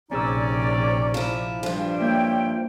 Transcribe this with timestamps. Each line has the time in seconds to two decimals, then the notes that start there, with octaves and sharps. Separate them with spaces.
0.11 A#1 C3 C4 C#4 D#4 G#4 D5 E6
1.14 F3 E4
1.63 G2 F3 G3 D4
2.01 A#3 E4 C#5 G5